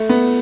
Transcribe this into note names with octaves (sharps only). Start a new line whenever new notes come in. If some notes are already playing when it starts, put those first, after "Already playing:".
Already playing: A3
B3